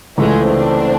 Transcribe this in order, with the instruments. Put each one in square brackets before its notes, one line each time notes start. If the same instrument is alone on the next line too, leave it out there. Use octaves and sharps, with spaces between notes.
[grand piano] C#2 C#3 E3 A3 [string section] G#3
[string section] C4 D4